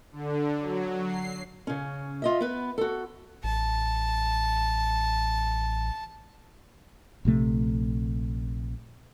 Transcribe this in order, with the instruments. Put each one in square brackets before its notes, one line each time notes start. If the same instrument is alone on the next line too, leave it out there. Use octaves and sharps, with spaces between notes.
[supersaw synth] D3
F#3
C7
[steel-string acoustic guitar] C#3 C#4
F4 D#5 E5
B3 B4
F#4 A4
[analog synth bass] A1 [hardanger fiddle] A5
[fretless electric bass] A#1 C3 A3